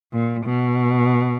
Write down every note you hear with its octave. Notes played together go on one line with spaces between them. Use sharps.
A#2
B2